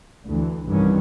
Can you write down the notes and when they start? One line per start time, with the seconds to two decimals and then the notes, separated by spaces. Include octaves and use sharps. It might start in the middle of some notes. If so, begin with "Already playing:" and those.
0.25 D2 E3
0.69 C2 G2 D#3 E3 C#4